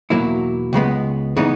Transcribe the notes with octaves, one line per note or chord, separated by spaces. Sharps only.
E2 B2 F#3 A#3 E4
C#2 C#3 G#3 B3
C#3 E3 G#3 B3 D#4